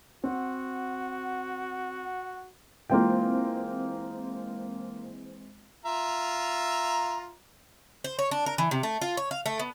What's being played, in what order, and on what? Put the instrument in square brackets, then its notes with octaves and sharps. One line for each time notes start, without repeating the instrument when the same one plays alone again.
[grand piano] C4 [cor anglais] F#4 [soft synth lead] F#5
[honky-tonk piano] E3 G#3 C4 [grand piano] A#3 F4 G5
[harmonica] F4 E5 A#5
[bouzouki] C5
C#5
D4
A#4
E3
C3
A3
F4
C#5
F5
A3
B3